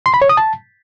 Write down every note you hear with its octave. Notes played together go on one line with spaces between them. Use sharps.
C6
B5
C#5
D#6
A5